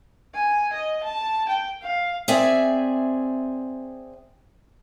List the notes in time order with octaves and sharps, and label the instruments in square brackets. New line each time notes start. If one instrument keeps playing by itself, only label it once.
[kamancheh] G#5
D#5
A5
G5
F5
[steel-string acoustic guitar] C4 G#4 D5 E5 G#5